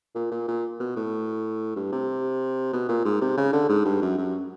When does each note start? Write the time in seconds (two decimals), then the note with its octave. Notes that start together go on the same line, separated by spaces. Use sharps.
0.15 A#2
0.31 A#2
0.48 A#2
0.80 B2
0.96 A2
1.76 G2
1.92 C3
2.73 B2
2.89 A#2
3.05 G#2
3.21 C3
3.37 C#3
3.53 D3
3.69 G#2
3.85 G2
4.02 F#2
4.18 F#2